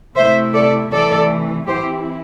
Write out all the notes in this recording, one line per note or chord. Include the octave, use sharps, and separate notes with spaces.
C3 A3 E4 C5 E5
A4 D5
C3 E3 A3 A4 D5
E3 C4 E4 G4 C5